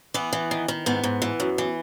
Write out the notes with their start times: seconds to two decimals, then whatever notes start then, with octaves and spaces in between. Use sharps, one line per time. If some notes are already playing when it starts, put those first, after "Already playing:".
0.14 E3 B3
0.33 E3
0.51 D#3
0.68 D#3
0.86 G#2 B3
1.04 G#2
1.22 E3
1.40 F#2
1.58 E3